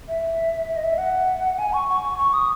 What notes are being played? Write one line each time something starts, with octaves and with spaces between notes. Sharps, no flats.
E5
E5
D#5
E5
F#5
G#5
C#6
C#6
C#6
D#6